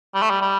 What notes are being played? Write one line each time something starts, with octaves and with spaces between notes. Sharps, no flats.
G3
A3
G3
G3